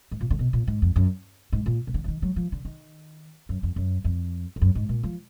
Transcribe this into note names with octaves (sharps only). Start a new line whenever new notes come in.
G#2
A#2
D3
B2
A#2
G#2
F2
F#2
G#2
A#2
B2
D3
F3
D#3
F#3
F3
D3
D#3
F#2
F2
F#2
F2
F2
F#2
G#2
A#2
F3